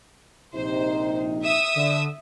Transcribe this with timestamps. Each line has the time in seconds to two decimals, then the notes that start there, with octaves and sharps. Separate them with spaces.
0.54 A#1 C3 D#4 C5
1.42 E5 D#6 E6
1.76 D3